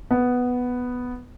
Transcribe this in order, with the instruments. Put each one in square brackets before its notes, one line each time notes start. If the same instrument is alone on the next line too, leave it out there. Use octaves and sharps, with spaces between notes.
[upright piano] B3